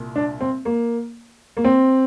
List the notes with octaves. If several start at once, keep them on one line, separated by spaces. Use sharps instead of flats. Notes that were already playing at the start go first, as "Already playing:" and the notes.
Already playing: C2 A#2
D4
C4
A#3
A#3
C4